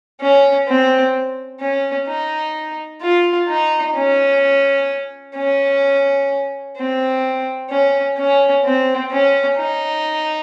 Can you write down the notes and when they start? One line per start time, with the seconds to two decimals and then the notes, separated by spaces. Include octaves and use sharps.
0.21 C#4
0.68 C4
1.61 C#4
2.08 D#4
3.02 F4
3.48 D#4
3.95 C#4
5.36 C#4
6.77 C4
7.70 C#4
8.18 C#4
8.64 C4
9.12 C#4
9.57 D#4